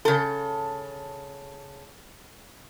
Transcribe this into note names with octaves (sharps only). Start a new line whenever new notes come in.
C#3 A4